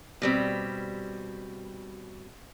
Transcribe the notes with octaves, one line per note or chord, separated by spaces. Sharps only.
B2 G3 C4